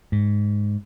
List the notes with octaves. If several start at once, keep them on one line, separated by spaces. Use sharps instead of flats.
G#2